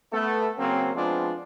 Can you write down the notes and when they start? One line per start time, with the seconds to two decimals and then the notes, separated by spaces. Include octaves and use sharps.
0.12 A3 B3 A4
0.58 C#3 F#3 A#3 C4
0.95 F3 G#3 B3 C4 D4 F4